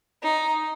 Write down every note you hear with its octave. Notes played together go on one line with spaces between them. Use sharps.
D#4